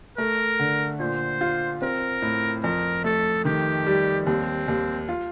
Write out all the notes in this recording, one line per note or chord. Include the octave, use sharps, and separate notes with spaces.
A3 A#4
D3
A#2 C5
F4
C4 A#4
A2
F2 A#4
A3 A4
D#3 G4
G3
D#2 C4
D#2
F4